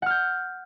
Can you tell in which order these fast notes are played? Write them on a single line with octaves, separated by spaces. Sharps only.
F#5 F6 G6